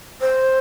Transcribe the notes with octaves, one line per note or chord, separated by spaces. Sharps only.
C5